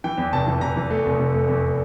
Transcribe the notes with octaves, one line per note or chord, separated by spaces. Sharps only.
E3 G5
E2
F1 A5
E3
F1 A#5
E3
A3
F1
F1
A3
E2